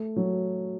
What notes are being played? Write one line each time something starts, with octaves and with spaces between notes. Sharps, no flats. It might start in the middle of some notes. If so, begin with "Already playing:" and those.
Already playing: A3
F#3